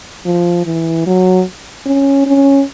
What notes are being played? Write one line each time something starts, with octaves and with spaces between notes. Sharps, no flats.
F3
E3
F#3
C#4
C#4